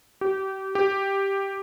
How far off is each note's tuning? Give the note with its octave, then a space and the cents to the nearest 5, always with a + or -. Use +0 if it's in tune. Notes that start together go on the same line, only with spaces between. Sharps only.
G4 -25
G4 +5